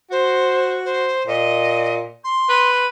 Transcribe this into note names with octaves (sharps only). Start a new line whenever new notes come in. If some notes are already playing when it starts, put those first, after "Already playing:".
F#4 C5
C5
A#2 D#5
C6
B4